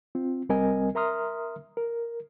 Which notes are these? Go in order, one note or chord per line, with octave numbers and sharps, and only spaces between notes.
C4 F4
C2 G3 C4 A#4 D#5 G#5
A#4 E5 A#5 C6 D#6 F6
A#4